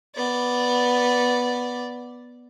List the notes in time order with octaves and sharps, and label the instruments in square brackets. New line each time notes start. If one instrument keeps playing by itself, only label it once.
[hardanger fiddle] B3 D5